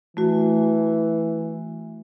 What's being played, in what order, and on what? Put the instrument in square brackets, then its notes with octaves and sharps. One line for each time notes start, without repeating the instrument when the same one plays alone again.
[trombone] E3 [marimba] A3 F#4